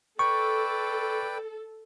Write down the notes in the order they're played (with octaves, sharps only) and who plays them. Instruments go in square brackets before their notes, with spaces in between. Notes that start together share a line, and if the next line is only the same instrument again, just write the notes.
[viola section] A4 [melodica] B4 D5 G5 [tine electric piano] C#6